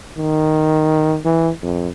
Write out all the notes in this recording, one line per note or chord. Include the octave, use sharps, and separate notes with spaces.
D#3
E3
F2